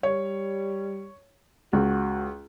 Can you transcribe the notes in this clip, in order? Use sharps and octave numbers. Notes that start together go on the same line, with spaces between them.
G3 C#5
C#2 F#4